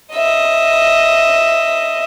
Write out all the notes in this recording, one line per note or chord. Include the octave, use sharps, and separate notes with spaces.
D#5 E5